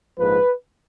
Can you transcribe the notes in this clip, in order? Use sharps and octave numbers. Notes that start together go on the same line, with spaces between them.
A#1 G#2 F3 B4